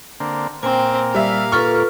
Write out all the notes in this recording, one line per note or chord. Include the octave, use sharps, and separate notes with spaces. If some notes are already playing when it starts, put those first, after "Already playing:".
D3 A#3 C4
A#2 A#3 C4 G#5
G3 E5 F5
F4 A4 B4 C#6 F6